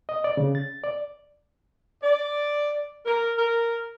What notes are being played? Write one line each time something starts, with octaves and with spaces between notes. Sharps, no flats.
D#5
D5
C#3
A6
D5
D5
A#4
A#4